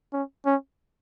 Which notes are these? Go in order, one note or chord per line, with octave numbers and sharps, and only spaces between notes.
C#4
C#4